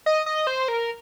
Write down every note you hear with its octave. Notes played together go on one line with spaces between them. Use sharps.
D#5
D#5
C5
A#4